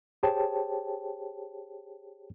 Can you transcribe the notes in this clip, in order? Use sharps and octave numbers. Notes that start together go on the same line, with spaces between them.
G4 G#4 C5 C#5 G5 A5